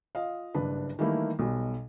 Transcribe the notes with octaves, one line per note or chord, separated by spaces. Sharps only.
F4 D#5 F5
F#1 G2 D4 B4
D#3 E3 G3 A3 A#3 E4
B1 B2 G3